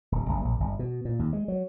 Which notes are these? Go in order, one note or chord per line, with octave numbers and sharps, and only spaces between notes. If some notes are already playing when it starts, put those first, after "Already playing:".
D1
F#1
A#1
G1
B2
A#2
D#2
G#3
F#3